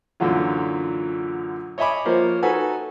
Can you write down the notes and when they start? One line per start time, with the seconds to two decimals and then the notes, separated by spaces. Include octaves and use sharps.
0.20 F#2 A#2 D3 E3 F#3 F4
1.78 C#5 D#5 E5 G#5 B5 D6
2.05 F3 A#3 A#4 C5 C#5
2.43 D#4 F#4 A4 B4 F#5 G#5